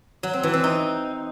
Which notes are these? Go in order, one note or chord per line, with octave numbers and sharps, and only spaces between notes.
F#3
C4
E3
C4
D#4